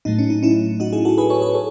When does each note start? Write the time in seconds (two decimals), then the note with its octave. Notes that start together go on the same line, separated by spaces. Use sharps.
0.05 A2 F#3 A3 D#4
0.19 C#4
0.30 D#4
0.43 C#4 E4
0.80 D#4 F#4
0.93 E4 G#4
1.05 F#4 A4
1.18 G#4 B4
1.30 A4 C#5
1.42 G#4 B4
1.55 A4 C#5